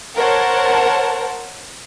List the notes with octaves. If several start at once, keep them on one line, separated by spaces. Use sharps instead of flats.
A#4 C5 C#5 F#5 A5